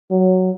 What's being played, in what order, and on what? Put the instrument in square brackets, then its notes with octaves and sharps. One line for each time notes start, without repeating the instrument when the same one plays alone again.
[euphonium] F#3